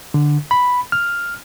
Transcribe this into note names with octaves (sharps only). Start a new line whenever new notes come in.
D3
B5
F6